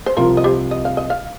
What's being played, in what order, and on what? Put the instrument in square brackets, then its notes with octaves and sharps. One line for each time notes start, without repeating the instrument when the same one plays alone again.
[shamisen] C5
[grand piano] C2 C3 F3 [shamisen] F4 A#4
[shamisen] D#5
G4 C5
D#5
F5
D#5
F5